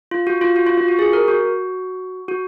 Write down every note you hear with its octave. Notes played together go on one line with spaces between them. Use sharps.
F4
F#4
F4
F#4
F4
F4
F#4
G#4
A#4
F#4
F#4